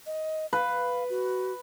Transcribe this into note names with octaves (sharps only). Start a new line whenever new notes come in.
D#5
B4 F5
F#4